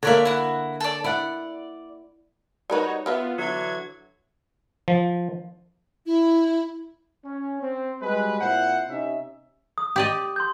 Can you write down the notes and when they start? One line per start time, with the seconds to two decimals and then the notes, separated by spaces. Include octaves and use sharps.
0.03 D3 A#3 C#5 D5 E5
0.25 E4 F#4
0.80 A4 D5
1.04 E4 D5 F#5
2.70 G3 D#4 F#4 A#4 B4 C#5
3.06 B3 F4 A#4 B4 E5
3.38 D3 E3 F#3 G#6
4.88 F3
6.06 E4
7.24 C#4
7.61 C4
8.01 G3 G#3 F#4 B4
8.41 A#2 C4 E4 C5 F#5
8.89 C3 C#4 D#4 E5
9.78 D#6
9.96 G4 D5 D#5
10.36 C6 G6